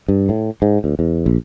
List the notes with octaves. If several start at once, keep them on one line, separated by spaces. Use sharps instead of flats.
G2
A2
G#2
D2
E2
A#1